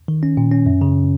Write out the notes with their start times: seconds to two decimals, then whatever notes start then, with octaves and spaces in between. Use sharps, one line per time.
0.08 D#3
0.23 C#4
0.37 A#2
0.52 C#4
0.66 F#2
0.81 C#3